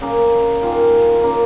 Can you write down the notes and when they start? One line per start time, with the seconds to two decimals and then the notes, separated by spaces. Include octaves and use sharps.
0.01 C#3 A#3 G#4
0.62 D#3 A#3 F4
1.23 C#3 A#3 A#4